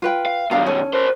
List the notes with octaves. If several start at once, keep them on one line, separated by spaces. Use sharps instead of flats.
F4 B4 G5
F5
B2 D#3 D4 F5 A#5
C#4 A4
A#4 C5